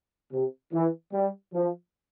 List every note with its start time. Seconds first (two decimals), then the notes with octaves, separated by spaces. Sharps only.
0.33 C3
0.73 E3
1.13 G3
1.54 F3